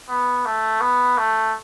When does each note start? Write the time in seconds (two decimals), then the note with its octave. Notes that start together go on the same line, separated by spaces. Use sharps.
0.09 B3
0.46 A3
0.81 B3
1.18 A3